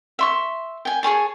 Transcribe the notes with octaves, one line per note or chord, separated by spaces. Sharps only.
E5 C6 C#6
G5 G#5
G#4 C#5 G#5 A5